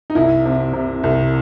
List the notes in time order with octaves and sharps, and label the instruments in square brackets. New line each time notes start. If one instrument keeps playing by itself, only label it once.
[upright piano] D#4
C2 E4
C3
C3
C2